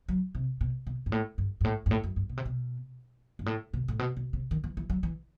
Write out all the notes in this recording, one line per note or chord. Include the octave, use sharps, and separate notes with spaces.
F#3
C3
B2
B2
G2
A2
G2
G2
A2
G2
A2
F#2
G2
B2
C3
B2
G2
A2
B2
A2
B2
B2
C3
D#3
E3
E3
F#3
E3